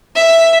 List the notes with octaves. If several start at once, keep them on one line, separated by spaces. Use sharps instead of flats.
E5